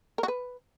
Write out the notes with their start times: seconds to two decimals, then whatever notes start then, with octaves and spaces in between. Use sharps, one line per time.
0.18 A#4
0.23 F#4
0.28 B4